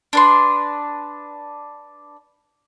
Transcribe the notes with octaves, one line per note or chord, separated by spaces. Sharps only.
D4 B4 C6